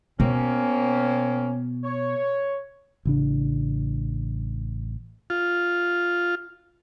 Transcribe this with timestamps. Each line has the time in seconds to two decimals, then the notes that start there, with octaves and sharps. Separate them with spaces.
0.20 B2 A#3 C4 C#4
1.84 C#5
3.05 A1 C#3 D4
5.30 F4